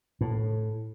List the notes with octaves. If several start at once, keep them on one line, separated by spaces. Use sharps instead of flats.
A2